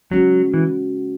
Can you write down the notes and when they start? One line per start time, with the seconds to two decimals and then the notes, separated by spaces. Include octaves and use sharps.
0.11 F#3 G#3 C#4 F#4
0.54 E3